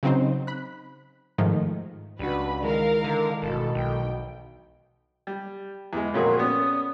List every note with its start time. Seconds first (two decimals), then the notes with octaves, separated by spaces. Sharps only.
0.03 C#3 F#3 C4 D#4 C5
0.47 B5 F#6
1.38 G#2 D#3 F3 A3
2.19 C#2 G3 D4 F#4 B4 B5
2.63 D#3 E3 G#3 A#4 F5
3.04 D3
3.42 G1 B2 A4
3.75 B1 G5
5.27 G3
5.93 E2 G#3
6.14 F2 A#2 F#4 G#4 A#4 C#5
6.39 B3 C#4 D5 D#6